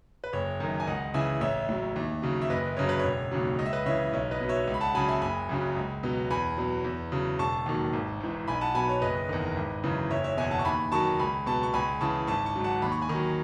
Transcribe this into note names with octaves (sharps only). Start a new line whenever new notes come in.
B4
F#1 C#5
F#2 D#3
G#5
C#2 D#5 F#5
C#3 E3 E5 G#5
A1 C#5 E5
A2 F#3
D#2
C#3 F#3
E5
F#1 B4 D#5
F#2 C#3 F#3 C#5
B4
E1 C#5
D#2 C#3 F#3
C#2 D#5
E5
B4 D#5
C#3 E3 C#5 E5
B1 C#5
B4 D#5
B2 F#3
C#5 E5
C#2
B5
F#5 A5
C#3 F#3 G#5 B5
E5 G#5
F#1 G#5 B5
F#2 C#3 F#3
C#2
B2 F#3
E2 G#5 B5
B2 F#3
E2
C#3 F#3
E1 A5 C#6
D#2 D#3 F#3
G#1
G#2 E3
B1 G#5 B5
F#5 A5
B2 F#3 G#5 B5
C#5
F#1 B4 D#5
E2 D#3
G#1
F#2 C#3 E3
F#1 C#5 E5
C#5 E5
E2 B2 E5 G#5
F#5 A5
C#6
D#2 G#5 B5
D#3 F#3 A5 C#6
C#2 G#5 B5
B2 F#3 A5 C#6
C#6
C#2 G#5 B5
C#3 E3 A5 C#6
G#1 A5 C#6
A5 C#6
G#2 F#3
F#5 A5
D#2 B5
C#6
G#5 B5
D#3 F#3